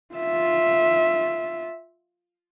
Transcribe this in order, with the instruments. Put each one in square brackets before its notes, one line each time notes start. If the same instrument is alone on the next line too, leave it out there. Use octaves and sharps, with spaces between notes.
[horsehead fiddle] F4 E5